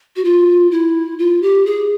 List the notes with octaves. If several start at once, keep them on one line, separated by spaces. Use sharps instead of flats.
F#4
F4
E4
F4
G4
G#4